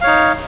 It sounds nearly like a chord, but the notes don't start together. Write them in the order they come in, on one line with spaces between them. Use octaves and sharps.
F5 C#5 D#4